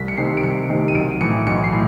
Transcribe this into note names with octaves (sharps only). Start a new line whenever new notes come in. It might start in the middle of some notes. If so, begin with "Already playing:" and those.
Already playing: C2 B6
C#7
C3 D#3 C7
D7
C2 C#7
C3 D#3
D#7
B1 D7
A2 E3 C#7
B1 C#7
C7
A2